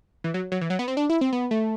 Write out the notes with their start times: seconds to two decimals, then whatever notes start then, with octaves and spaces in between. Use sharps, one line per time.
0.24 E3
0.34 F#3
0.52 F#3
0.61 E3
0.70 F#3
0.79 B3
0.88 C4
0.97 D4
1.10 E4
1.21 C4
1.33 B3
1.51 A3